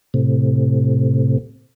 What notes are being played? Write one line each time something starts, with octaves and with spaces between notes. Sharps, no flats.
A2 C3